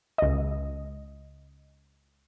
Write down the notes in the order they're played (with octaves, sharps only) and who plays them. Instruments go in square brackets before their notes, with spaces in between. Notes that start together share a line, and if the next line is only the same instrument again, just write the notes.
[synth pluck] C#2 D#5